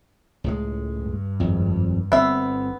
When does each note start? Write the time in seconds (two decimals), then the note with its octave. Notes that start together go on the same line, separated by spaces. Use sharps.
0.44 C#2 A2 G#3
0.96 G2
1.40 G#1 F2
2.12 G1 B3 C4 E5